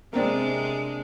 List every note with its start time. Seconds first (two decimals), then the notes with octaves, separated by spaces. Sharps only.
0.13 C3 G#3 A#3 C4 D4 D5